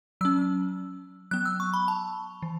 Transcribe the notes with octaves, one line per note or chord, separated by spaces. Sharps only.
F#3 C#4 E6
F#3 B3 F#6
E6
C#6
B5
A5
E3